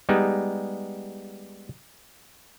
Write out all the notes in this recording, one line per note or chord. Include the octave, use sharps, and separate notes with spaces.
G3 G#3 B3 D#4